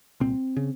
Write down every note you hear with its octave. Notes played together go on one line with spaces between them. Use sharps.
C2 A#2 C4
C#3